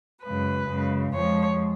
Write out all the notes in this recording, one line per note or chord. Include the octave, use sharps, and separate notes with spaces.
F#2 C#3 G#3 B4
F#2 C#3 G#3
F2 F3 G#3 C#5